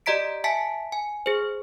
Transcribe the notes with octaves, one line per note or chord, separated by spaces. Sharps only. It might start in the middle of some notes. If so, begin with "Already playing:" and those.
G4 D5 D#5 A#5 B6 D7
E5 G#5 A5 B6
G#5
G#4 C5